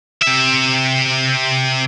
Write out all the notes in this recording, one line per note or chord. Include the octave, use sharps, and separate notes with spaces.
C3 E5